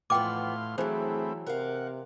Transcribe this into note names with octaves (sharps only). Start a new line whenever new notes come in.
E2 A2 F3 B3 F5 G5 C6 D6
E3 F#3 A3 C4 E4 G#4 C5
C3 A#4 F5 F#5